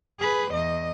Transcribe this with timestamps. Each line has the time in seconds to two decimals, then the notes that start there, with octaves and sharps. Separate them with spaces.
0.19 G#4 B4
0.52 E2 D#5